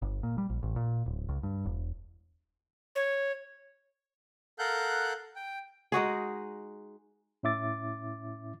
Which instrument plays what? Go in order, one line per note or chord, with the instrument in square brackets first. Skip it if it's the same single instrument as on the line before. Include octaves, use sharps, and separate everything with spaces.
[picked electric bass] G1
A#2
G3
A#1
A1
A#2
D1
C#2
G2
E1
[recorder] C#5
[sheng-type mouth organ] A4 A#4 F5 F#5 F#6 G6
G5
[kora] G#3 D#4 F#4 G#4
[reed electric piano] A2 C#4 E4 E5 D6 A6